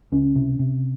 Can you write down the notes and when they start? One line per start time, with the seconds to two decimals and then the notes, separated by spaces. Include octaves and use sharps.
0.12 C#2 C#4
0.35 C3
0.59 C3